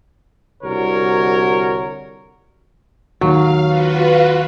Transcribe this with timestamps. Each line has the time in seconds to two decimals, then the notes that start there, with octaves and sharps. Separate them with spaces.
0.63 C2 D3 F#4 A#4 C#5
3.21 D#2 F#3 F5
3.66 F4 F#4 B4 F5